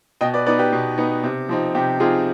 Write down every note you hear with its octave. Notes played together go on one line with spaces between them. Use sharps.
B2 D#5 G5
B4 D5
B3 D#4 B4 D5
G4 B4
B2
B3 D#4
C3
F3 C4 D#4
C3 G4
F3 C4 D#4 F4 G#4